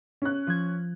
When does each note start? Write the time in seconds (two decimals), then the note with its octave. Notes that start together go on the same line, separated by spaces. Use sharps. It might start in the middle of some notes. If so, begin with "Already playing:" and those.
0.22 C#4 F#6
0.47 F3 G#6